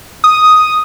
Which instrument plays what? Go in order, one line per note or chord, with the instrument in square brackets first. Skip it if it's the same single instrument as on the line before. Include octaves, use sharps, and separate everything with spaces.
[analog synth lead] D#6